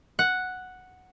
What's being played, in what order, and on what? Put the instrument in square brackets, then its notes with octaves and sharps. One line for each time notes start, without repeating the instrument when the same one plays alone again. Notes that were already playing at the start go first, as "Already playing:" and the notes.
[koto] F#5